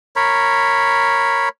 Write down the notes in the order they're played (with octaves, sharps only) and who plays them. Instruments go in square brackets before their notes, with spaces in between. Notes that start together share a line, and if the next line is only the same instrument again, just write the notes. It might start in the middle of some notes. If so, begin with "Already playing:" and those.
[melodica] A#4 C#5 B5